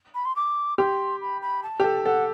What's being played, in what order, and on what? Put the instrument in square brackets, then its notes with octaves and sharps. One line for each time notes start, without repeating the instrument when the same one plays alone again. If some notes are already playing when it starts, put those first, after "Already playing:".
[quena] B5
C6
D6
[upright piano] G4 [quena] C6
[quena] B5
B5
A5
[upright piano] G4
A4
[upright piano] A4 [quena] F#5